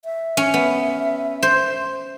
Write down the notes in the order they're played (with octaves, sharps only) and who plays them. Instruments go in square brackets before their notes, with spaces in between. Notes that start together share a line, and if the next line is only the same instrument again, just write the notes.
[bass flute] E5
[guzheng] C#4
B3
C5